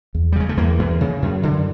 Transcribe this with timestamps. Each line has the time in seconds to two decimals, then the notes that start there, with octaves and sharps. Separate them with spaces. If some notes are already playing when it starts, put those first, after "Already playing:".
0.15 E2
0.32 G3
0.36 C#3 G#3
0.49 A3
0.57 E2 A#3
0.79 E2
1.01 C#3
1.22 F#2
1.43 D3